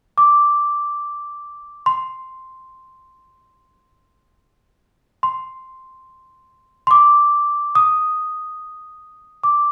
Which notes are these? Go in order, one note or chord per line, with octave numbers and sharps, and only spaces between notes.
D6
C6
C6
C6
D6
D#6
D6